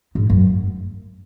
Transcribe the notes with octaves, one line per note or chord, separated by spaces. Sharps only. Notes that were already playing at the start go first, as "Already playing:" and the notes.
G#2
F#2